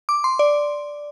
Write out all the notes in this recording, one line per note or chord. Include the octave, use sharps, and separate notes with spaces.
D6
C6
D5